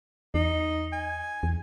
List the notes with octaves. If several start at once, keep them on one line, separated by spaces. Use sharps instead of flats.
E2 D#4
G#5
E2